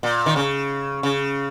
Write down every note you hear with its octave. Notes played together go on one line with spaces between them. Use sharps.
A#2
D#3
C#3
C#3